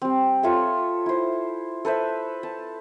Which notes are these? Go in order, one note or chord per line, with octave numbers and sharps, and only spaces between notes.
G3 C4
F4 A4 C#5 E5
E4 C5
A4 B4 C5 E5
A5